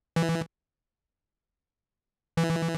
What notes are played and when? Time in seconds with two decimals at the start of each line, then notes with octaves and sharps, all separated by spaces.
0.16 E3
2.37 E3